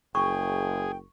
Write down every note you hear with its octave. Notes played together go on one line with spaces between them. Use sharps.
F#1 G#4 G5 C#6